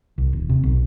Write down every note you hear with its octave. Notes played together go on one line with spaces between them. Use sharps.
C2
D#1
C3
B1